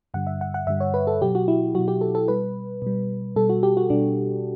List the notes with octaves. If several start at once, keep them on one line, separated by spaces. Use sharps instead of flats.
G2 D3 G3 F#5
E5
F#5
F#5
G2 D3 G3 E5
C#5
B4
A4
B2 F#3 G4
F#4
E4
B2 F#3 F#4
G4
A4
A4
B2 G3 B4
B2 G3
B2 G3 A4
F#4
G4
F#4
B2 G3 D4